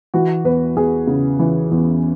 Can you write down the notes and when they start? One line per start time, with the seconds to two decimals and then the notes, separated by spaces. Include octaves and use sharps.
0.14 E3 F#4
0.44 E2 B4
0.76 E2 G#4
1.07 C#3
1.39 E3
1.71 E2